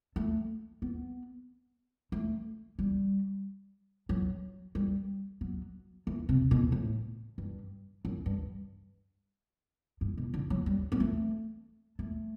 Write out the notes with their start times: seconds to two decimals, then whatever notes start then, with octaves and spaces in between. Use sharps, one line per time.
0.16 A3
0.82 B3
2.12 A3
2.79 G3
4.09 F#3
4.75 G3
5.41 F#3
6.07 E3
6.29 C3
6.51 B2
6.72 A2
7.38 G2
8.05 F#2
8.26 G2
10.01 G2
10.17 B2
10.34 D3
10.50 F#3
10.66 G3
10.92 B3
11.00 A3
11.99 A3